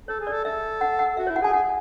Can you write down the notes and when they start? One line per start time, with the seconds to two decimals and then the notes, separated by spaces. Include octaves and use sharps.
0.08 A4 C#5
0.20 G#4
0.27 D5
0.33 A4
0.45 A4 E5
0.81 F#5
0.99 F#5
1.17 F#4 E5
1.27 C#5
1.30 E4
1.36 F#5
1.42 G#4 G#5
1.53 G#4 F#5